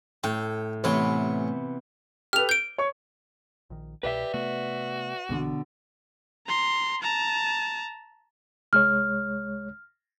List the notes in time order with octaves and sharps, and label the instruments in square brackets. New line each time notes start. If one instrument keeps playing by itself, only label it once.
[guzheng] A2 [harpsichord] G5
[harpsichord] A1 C#5 [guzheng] C3 E3 B3
[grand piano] G4 A4 B4 [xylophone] F6 F7
[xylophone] G6 D7 [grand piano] G7
[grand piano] C#5 C#6
[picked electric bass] A#1 D#3
[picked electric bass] C2 B2 [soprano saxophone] G4 [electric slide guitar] B4 D5 E5
[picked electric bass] C3 A3 B3 [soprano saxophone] F#4
[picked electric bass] A#1 E3 [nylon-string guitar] B2 D3
[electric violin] A#5 C6
A5 A#5
[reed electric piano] C2 G#3 C#5 [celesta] F6